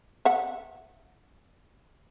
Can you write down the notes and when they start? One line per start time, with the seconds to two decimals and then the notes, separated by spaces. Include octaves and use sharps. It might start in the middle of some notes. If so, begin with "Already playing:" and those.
0.25 E5 F#5